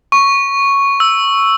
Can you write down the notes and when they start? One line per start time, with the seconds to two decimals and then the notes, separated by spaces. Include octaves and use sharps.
0.12 C#6
1.00 E6